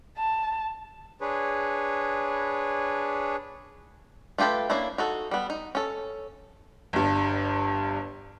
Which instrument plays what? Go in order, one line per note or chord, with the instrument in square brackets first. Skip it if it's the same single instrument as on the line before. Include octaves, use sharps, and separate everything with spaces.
[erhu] A5
[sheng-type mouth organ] D4 G#4 B4 C#5
[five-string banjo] A3 F4 G4 A4 B4
A#3 C#4 D4 E4
D#4 F#4 A4
G3 B3
D#4
C#4 A4
[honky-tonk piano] G1 G2